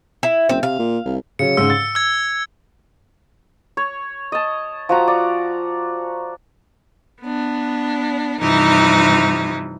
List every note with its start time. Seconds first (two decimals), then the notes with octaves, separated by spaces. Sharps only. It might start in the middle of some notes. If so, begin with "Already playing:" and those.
0.23 E4
0.49 F#1 C4
0.63 C3 F5
0.79 A#2
1.05 C2
1.39 C#3 F#3 C#7
1.57 G#2 C#3 E6
1.70 A6
1.95 E6 G#6
3.77 C#5
4.32 D#5 A5
4.89 F3 F#4 A#5
5.08 D5
7.22 B3 D4
8.40 G2 C3 E3 F3 D#4